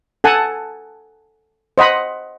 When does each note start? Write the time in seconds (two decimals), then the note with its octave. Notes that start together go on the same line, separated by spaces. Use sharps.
0.24 A4 F#5 G#5 A5
1.78 C5 D#5 F#5 B5